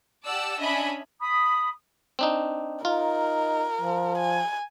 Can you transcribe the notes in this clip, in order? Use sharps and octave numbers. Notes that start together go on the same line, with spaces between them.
G4 D5 F#5 A5 E6
C#4 D4 D#5 E5 G#5 B5
B5 D#6
C4 D4 D#4
D#4 F4 A#4
F3
G#5